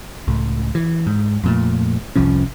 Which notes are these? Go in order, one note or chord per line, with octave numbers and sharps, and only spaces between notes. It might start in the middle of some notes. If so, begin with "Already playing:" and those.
C#2 A2
E3
G#2
F2 A#2 A3
F1 C2 F3 C#4